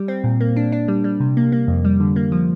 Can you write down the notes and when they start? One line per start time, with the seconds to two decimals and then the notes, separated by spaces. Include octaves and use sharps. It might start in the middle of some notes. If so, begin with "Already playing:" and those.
Already playing: G3
0.08 C4
0.24 A#2
0.40 A#3
0.56 D4
0.72 D4
0.88 G3
1.04 G3
1.20 C3
1.37 A#3
1.52 A#3
1.68 F2
1.85 G3
2.00 D3
2.16 A#3
2.32 F3